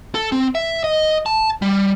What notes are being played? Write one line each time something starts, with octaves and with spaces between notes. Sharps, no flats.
A4
C4
E5
D#5
A5
G3